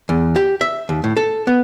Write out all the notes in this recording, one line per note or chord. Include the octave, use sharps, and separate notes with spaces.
E2
G4
E5
D#2
A2
A4
B3